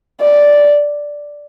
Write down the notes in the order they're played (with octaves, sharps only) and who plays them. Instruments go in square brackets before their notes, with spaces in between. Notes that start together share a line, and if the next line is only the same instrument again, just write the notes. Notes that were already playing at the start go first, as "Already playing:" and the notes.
[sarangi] D5